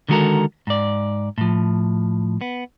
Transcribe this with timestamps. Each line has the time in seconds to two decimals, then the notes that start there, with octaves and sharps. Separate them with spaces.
0.08 D3 D#3 G#3 F#4 A4 A#4
0.67 G#2 D5
1.38 A2 F3
2.41 B3